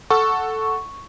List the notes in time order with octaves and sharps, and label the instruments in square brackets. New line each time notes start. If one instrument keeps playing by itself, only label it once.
[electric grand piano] A4 F#5 [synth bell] C#6